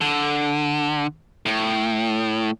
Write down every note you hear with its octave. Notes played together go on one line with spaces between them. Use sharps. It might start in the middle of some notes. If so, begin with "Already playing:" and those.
D3
A2